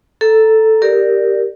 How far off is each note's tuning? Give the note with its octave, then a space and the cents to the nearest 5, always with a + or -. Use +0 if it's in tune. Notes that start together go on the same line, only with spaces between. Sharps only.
A4 +0 A#5 +0
G4 +0 A#4 -10 D5 +0